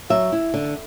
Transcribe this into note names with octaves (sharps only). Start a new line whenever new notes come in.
F#3 E5
E4
D3